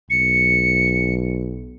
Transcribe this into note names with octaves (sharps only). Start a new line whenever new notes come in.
B1 C#7